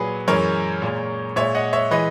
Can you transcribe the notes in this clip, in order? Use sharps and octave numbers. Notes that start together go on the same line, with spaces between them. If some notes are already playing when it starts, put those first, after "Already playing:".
Already playing: A#2 F#3 G#4 B4
F#2 E3 G#3 A#4 C#5
A#2 G#3
A#2 G#3 C#5 E5
D#5 F#5
C#5 E5
E3 G#3 B4 D#5